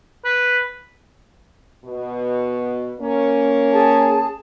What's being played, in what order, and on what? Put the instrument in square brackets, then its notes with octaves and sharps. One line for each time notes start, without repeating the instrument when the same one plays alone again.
[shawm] B4
[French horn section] B2
A#3 C#4
[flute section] G#4 A5